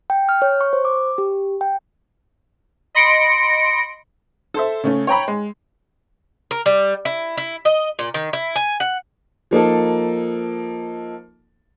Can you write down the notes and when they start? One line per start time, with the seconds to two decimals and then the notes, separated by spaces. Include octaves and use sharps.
0.10 G5
0.29 F6
0.42 C#5
0.61 C#6
0.73 C5
0.85 D6
1.18 G4
1.61 G5
2.95 D#5 B5 C6 A#6 C#7 D7
4.54 A4 C5 E5
4.84 C#3 A3 C#4
5.07 C#5 G5 A#5 B5
5.28 G#3
6.51 A#4
6.66 G3
7.05 E4
7.37 E4
7.65 D#5
7.99 A#2
8.14 D#3
8.33 E4
8.56 G#5
8.80 F#5
9.51 F3 A#3 D#4 A4